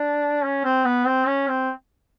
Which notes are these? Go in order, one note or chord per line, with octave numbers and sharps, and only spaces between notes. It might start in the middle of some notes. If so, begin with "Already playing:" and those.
Already playing: D4
C#4
C4
B3
C4
C#4
C4